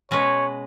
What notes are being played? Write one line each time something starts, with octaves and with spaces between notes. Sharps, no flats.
B2 G#3 C#4 B4 C#5